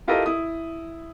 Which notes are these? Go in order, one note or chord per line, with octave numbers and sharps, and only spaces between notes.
E4 F4 G4 A4 A#4 D#5
E4 D#6